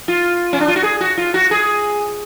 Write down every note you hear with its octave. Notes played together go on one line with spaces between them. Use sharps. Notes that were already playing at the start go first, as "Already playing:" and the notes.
F4
C#4
D4
F4
F#4
G#4
F#4
F4
F#4
G#4